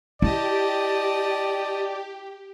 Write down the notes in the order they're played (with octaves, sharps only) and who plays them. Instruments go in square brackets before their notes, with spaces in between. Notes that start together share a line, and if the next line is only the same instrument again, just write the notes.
[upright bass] E4 [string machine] G4 [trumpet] D5 [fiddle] D#5 A5